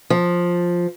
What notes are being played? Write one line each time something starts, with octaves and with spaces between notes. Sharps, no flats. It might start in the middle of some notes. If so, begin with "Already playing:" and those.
F3